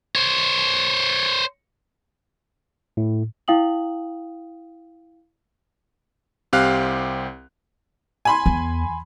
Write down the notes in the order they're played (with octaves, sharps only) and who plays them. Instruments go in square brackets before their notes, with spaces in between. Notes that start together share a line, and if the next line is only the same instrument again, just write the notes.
[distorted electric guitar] C5 C#5
[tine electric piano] A2
[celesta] E4 F5 G5 D#6 F#7
[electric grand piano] C2 C4 G4 F5 F6 F#6
[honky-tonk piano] G#5 B5 C6
[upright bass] E2